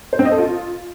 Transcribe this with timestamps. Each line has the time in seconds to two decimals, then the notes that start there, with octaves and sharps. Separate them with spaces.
0.13 C5
0.19 C4
0.25 D#5
0.32 A4
0.38 F4